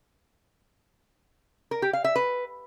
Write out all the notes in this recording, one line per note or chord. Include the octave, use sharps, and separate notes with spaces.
A#4
G4
F5
E5
B4